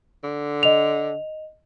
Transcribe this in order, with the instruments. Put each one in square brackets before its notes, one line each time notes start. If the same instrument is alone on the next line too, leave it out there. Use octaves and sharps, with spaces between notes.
[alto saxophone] D3
[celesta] D#5 F7